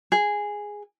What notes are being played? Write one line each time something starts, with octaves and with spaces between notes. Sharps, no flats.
G#4